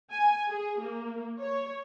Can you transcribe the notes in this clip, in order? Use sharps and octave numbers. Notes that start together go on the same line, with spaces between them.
G#5
G#4
A#3
C#5